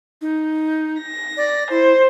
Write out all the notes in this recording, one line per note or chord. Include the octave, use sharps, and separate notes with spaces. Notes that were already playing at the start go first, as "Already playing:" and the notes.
D#4
A#6
D5
E4 C5